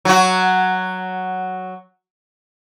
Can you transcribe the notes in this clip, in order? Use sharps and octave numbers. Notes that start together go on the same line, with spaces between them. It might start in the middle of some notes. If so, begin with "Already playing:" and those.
F#3 F#4